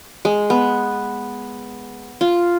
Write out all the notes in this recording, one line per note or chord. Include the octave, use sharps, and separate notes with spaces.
G#3
B3
F4